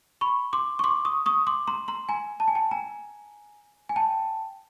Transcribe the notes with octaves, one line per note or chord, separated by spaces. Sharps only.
B5 C#6
C6 D6
C#6
C6 D6
C#6 D#6
C#6 D#6
C6 D6
A#5 C6
A#5 C6
G#5 A#5
A5
G#5
G5 A5
G#5 A#5
G#5
G5 A5